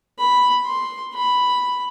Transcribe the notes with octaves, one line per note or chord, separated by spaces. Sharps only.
B5
C6
B5